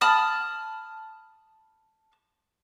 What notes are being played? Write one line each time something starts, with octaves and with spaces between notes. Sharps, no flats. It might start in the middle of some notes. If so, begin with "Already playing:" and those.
A5 B5 D#6 F6